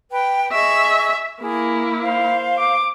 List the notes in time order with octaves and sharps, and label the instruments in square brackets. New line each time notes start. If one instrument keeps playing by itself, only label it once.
[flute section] B4 G5
[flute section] G#4 D#5 C#6 [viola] E5
[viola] A#3 E4 [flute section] G#4
[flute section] C5 F5
[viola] D6